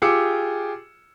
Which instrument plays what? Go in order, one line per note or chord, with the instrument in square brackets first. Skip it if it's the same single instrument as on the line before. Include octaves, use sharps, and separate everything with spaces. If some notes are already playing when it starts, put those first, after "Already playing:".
[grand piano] F4 G4 G#4 D6 E6 C#7